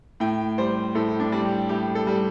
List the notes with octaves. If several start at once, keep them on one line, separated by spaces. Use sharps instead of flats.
A2 G5
G3 C5
A2 A4
D4
G3
G4
A2 G4
A4
G3